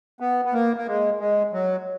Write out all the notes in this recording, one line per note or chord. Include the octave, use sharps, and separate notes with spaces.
B3
B3
A#3
A#3
G#3
G#3
F#3